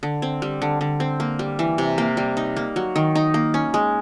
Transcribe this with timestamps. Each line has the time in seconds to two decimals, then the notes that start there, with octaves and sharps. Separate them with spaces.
0.03 D3
0.22 C4
0.42 G3
0.62 D3
0.81 D3
1.00 C4
1.20 A#3
1.39 G3
1.59 E3
1.78 C3
1.98 A#3
2.17 G3
2.37 D#4
2.56 A#3
2.76 F#3
2.96 D#3
3.15 D#4
3.34 A#3
3.54 C#4
3.74 G#3